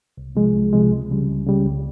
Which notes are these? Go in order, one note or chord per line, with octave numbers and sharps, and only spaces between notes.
C2
C3 F3 G#3
C2
C3 F3 G#3
C#2
C#3 G3
C#2
C#3 G3
C#2